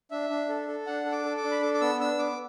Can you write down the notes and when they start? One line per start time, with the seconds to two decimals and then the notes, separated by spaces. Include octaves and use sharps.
0.11 D4 E5
0.30 D4
0.49 A4
0.68 A4
0.87 D4 F#5
1.06 A4
1.12 D6
1.25 A4
1.37 D6
1.44 D4
1.51 B5
1.62 A4 D6
1.74 D6
1.81 B3 E6
2.00 D4 E6
2.19 B3 D6